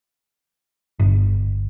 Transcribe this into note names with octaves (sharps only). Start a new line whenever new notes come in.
G1